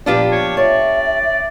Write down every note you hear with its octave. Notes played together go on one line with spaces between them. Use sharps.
A#2 F3 B3 D4 F4 G4
C#5
C#5 D5 E5